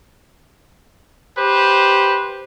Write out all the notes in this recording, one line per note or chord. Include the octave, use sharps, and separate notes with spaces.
G4 B4 C5